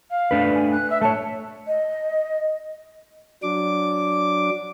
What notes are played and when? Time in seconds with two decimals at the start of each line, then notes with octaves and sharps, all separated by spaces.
0.10 F5
0.31 A3 D4 B4
0.54 G#5
0.71 F#6
0.90 E5
1.02 A3 C#5 A5
1.67 D#5
3.43 F#3 D4 D6